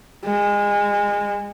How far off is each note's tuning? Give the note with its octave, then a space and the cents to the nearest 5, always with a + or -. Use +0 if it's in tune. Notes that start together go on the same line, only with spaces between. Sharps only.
G#3 -25